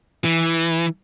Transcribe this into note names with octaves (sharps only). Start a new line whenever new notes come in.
E3